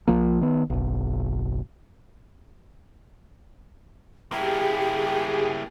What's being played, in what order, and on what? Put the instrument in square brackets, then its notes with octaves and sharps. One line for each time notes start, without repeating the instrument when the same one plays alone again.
[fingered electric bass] A#1 F3 A#3
D#3 B3
F#1 B1
[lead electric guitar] A#3 E4 [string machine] G4 G#4 [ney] G5